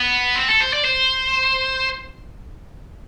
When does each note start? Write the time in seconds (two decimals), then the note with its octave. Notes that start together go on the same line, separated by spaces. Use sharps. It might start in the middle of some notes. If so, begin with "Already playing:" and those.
Already playing: B3
0.36 C4
0.49 A4
0.61 C5
0.73 D5
0.85 C5